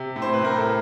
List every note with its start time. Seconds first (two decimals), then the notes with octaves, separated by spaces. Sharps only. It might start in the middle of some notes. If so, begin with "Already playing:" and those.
Already playing: C3
0.16 A2
0.22 C5
0.33 B4
0.42 A2 A#4
0.56 A4